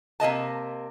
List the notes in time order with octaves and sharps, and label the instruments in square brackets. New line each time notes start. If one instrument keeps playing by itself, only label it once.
[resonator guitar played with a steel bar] C3 A#3 D#5 A5